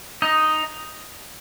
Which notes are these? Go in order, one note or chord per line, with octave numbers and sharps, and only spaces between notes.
D#4 D#5